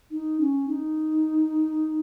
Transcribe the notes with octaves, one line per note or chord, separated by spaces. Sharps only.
D#4
C#4
D#4